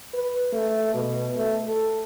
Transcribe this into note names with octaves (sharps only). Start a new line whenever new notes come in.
B4
A3
B2
A3
A4